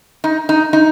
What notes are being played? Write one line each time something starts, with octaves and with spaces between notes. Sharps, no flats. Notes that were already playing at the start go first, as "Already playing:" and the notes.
D#4
D#4
D#4